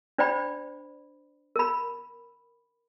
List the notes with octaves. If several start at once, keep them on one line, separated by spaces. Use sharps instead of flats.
D4 C5 D5 G5 B5
A#4 B5